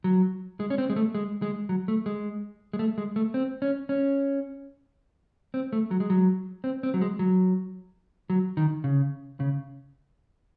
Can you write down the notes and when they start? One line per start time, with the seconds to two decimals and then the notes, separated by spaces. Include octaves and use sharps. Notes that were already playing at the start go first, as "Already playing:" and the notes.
0.04 F#3
0.60 G#3
0.70 C#4
0.78 C4
0.90 G#3
0.96 A3
1.15 G#3
1.42 G#3
1.69 F#3
1.88 A3
2.06 G#3
2.73 G#3
2.79 A3
2.98 G#3
3.16 A3
3.34 C4
3.62 C#4
3.89 C#4
5.54 C4
5.73 A3
5.91 F#3
6.00 G#3
6.10 F#3
6.64 C4
6.83 C4
6.94 F#3
7.01 G#3
7.19 F#3
8.30 F#3
8.57 D#3
8.84 C#3
9.40 C#3